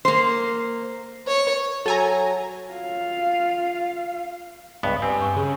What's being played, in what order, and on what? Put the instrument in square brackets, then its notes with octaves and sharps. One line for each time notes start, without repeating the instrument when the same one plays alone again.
[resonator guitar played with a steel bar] A#3 C5
[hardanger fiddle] C#5
[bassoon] F#3 [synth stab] A4 G#5 A#5 [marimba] C#5
[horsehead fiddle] F4 F5
[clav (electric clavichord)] C#2 G2 B3
[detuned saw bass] G2 [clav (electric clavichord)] C4 [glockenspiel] G#5
[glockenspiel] C#6
[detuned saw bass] C#3